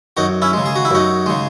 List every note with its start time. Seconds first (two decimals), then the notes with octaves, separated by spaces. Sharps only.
0.17 F#2 D#4 F#4
0.42 C#4 E4
0.53 C#3 G#3
0.66 G#4
0.75 F#4
0.85 E4
0.91 F#2 D#4 F#4
1.26 C#3 G#3